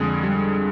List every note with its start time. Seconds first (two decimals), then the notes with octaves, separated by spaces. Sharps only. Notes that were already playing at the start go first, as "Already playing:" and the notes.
Already playing: F2 D3 G#3 G#4
0.23 G3